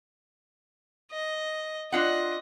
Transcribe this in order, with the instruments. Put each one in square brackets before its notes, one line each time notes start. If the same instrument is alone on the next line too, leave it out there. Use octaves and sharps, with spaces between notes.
[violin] D#5
[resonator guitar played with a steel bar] D4 F4 F#5 [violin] D#5